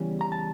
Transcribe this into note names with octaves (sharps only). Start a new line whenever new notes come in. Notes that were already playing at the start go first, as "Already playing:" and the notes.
Already playing: E2 C#3 E3 G3 C#4
A#5
A5